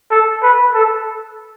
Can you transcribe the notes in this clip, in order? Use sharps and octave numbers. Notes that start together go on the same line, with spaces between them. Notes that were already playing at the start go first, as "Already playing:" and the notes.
A4
B4
A4